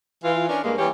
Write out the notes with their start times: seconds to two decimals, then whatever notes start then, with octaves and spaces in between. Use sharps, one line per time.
0.24 E3 F4
0.48 C#4 D4 A#4
0.63 G2 G#3 A#3
0.78 E3 G3 G4 C#5